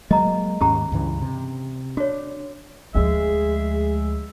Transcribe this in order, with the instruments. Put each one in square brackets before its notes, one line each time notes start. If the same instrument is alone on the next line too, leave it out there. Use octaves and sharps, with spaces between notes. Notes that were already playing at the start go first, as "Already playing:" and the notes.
[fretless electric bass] F#3 G#3 A#3 [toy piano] D#5 A#5
[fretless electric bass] D#2 G#2 [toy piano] C#4 G4 A#5
[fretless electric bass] C#2 G2 E3
C3
[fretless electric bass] D4 [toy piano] F#4 C#5
[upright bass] D2 F3 [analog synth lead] G#3 [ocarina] G#4 [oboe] E5